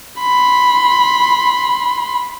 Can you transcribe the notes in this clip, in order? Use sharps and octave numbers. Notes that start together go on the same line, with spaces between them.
B5 C6